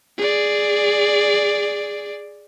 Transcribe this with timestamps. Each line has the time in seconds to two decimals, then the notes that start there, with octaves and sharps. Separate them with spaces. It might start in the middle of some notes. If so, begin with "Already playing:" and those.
0.18 G#4 D5